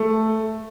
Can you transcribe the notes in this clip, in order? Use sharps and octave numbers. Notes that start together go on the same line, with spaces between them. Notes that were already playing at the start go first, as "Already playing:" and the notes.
Already playing: A3